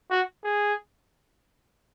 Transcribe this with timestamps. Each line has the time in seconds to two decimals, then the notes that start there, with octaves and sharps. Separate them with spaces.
0.11 F#4
0.44 G#4